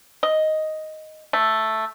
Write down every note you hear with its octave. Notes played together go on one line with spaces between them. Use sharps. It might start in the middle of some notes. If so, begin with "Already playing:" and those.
D#5
A3